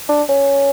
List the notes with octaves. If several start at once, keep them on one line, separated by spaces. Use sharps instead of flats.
D4
C#4